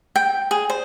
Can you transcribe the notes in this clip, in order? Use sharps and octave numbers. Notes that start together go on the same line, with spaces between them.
G5
G#4
C5